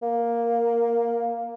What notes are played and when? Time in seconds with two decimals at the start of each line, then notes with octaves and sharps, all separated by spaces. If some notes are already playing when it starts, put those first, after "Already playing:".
0.02 A#3